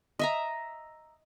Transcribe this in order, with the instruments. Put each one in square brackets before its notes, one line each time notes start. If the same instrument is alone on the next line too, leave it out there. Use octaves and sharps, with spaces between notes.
[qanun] D#5 E5 A#5